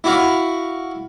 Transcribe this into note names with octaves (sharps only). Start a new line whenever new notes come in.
E4 F#4 F5